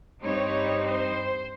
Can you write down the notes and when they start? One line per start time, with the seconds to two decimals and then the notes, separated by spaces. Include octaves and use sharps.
0.22 G2 G3 C4 D#4 C#5
0.85 C5